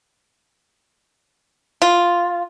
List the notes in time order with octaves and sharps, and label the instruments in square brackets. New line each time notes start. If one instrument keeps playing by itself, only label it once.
[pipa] F4